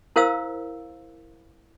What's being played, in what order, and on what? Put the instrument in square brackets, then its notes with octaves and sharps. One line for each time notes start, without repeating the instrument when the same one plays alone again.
[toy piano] E4 A#4 C5 F5 E6